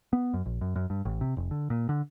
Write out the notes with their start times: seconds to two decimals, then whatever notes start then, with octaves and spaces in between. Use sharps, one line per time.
0.13 B3
0.34 F#2
0.46 A#1
0.61 F#2
0.76 F#2
0.90 G2
1.05 A1
1.21 C3
1.37 F1
1.51 D3
1.70 A#2
1.89 D3